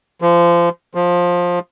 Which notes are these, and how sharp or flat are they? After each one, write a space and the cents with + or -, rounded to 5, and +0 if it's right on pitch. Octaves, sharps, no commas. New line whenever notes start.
F3 -25
F3 +15